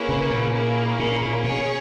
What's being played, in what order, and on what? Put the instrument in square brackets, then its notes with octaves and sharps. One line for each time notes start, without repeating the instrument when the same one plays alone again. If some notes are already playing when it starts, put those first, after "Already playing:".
Already playing: [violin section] A#3 C#4 E4 G#4 B4
[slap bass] C#3
A#2
[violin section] A#3 C#4 E4 G#4
[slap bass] A#2
A#2
[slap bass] B2 [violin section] C#4 G#4 C#5